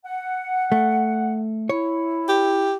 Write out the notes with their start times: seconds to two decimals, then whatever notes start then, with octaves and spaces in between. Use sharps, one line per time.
0.05 F#5
0.72 A3
1.69 E4 C#5
2.28 G4